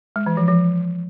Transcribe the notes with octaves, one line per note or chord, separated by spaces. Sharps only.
G#3
E3
F3
F3